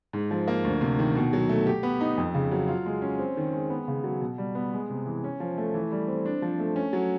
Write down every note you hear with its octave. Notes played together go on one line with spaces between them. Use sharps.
G#2
F3
A#3
D2
C3
D#3
B2
F#3
A3
G4
B3
D#4
F2
C#3
F#3
F4
G#3
C#4
C4
D#3
G#3
B3
C#3
F#3
B2
G3
B3
G#3
C3
E3
C#4
F3
A3
E3
G3
C4
D4
F3
A3
C#4
F#3